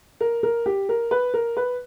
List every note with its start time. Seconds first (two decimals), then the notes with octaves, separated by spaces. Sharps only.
0.21 A#4
0.43 A#4
0.66 G4
0.89 A#4
1.11 B4
1.34 A#4
1.57 B4